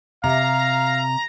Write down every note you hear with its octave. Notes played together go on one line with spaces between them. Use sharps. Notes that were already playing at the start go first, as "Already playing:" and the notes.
C3 F5 A#5